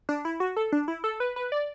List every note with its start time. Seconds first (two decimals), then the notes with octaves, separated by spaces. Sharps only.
0.09 D4
0.25 E4
0.40 F#4
0.56 A4
0.72 D4
0.88 E4
1.04 A4
1.20 B4
1.36 B4
1.52 D5